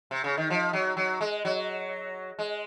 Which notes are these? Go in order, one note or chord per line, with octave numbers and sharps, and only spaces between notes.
C3
C#3
D#3
F3
F#3
F#3
G#3
F#3
G#3